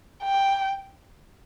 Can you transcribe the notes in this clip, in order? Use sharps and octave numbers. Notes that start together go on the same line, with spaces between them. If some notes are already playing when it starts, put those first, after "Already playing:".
G5